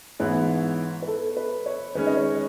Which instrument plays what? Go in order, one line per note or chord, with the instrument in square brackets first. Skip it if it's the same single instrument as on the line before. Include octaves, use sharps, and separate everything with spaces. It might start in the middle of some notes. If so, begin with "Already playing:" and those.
[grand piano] G#2 E3 B3 E4 [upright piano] C#5
[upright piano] B4
A4
B4
C#5
[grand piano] D#3 G#3 C#4 [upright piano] B4
[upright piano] D#5
C#5